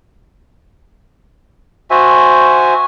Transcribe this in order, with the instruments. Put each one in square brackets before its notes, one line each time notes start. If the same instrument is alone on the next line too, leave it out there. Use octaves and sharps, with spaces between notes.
[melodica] F#4 C5 E5 G#5